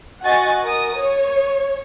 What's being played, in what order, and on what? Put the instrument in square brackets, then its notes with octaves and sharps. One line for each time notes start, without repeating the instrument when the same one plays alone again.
[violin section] F#4 D#5 F#5 G#5 C#6 A6
A#4 D#6
C#5